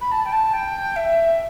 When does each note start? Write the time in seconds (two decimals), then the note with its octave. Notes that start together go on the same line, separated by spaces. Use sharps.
0.01 B5
0.11 A5
0.25 G5
0.32 A5
0.53 G5
0.96 E5